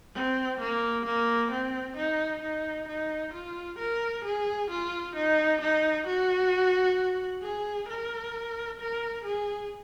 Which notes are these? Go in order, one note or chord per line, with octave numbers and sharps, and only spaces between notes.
C4
A#3
A#3
C4
D#4
D#4
D#4
F4
A#4
G#4
F4
D#4
D#4
F#4
G#4
A#4
A#4
G#4